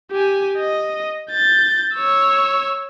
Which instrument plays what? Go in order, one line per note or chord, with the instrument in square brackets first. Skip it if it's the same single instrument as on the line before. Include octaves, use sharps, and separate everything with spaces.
[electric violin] G4 G#5
D#5
G6 A6
C#5 E6